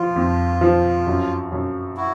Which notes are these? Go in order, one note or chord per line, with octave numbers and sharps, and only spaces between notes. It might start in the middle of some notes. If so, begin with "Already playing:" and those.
Already playing: F3 F4
F2
F3
F#2
F#2
E4 F#4